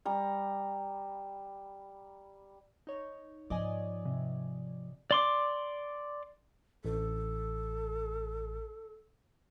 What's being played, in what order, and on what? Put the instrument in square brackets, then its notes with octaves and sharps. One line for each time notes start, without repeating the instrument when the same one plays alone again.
[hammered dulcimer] G3 A#5
[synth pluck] D#4 C#5
[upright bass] G#2 F3 [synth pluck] D5 D#5 G#5
[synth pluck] C3
[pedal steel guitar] D5 C6 D6
[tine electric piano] A1 [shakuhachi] A4